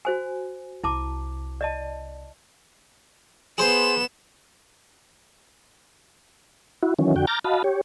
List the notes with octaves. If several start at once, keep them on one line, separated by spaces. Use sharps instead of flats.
F#4 C5 G#5
C2 E4 A5 D6
D5 D#5 A5
B3 G#4 C5 E7
E4 F#4
D#3 E3 F#3 C#4
F2 D3 F#4 G5
A#5 D6 F6 G6 A6 A#6
F#4 D#5 F5 A5 B5
G4 C#5